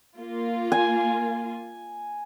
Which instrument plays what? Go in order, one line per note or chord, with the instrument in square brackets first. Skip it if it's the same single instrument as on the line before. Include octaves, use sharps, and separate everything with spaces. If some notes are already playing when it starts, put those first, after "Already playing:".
[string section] A#3 F4
[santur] G#5